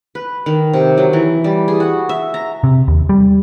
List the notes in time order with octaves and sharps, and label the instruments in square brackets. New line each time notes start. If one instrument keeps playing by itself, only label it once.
[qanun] B4
D#3
C3
F#3
E3
G3
G#4
F#4
E5
A#5
[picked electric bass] C3
D#2
G3